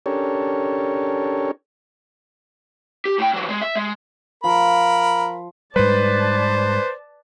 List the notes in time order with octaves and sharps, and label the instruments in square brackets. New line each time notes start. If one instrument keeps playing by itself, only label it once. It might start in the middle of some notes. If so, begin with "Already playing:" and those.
[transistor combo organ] C#4 D4 G4 A4 A#4 C#5
[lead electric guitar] G4
A2 G5
E3 F#3
G#3
E5
G#3
[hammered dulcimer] F3 [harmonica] A#4 B5
[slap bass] G#2 G3 [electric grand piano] B4 [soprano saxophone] C5 [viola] D5 A5